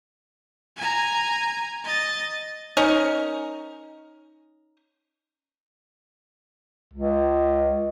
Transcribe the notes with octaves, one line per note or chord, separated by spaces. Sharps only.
G#5 A#5
D#5 A6
C#4 D#4 A#4
C#2